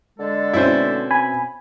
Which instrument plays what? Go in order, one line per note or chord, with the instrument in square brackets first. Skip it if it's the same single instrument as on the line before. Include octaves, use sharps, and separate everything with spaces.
[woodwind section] D3 G#3 A4
[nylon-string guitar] B2 C4 C#4 [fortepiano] E4 C5
[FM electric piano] G#5 B5